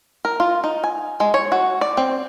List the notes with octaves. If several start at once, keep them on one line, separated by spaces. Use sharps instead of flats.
A#4
F4
D#4
G#5
G#3
C#5
F#4
D5
C4